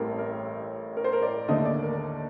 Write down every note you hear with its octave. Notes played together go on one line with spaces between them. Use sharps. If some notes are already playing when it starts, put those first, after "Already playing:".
Already playing: A1 A2 G3 C4 A4 A#4
A#4
A#4
C5
A#4
D5
D#2 D3 A3 D4 D#5
D5
A#4